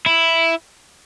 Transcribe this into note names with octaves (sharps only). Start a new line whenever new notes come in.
E4